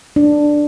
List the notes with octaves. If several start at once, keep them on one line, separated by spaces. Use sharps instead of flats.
D4